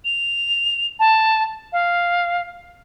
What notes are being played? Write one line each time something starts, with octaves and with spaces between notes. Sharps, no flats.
F7
A5
F5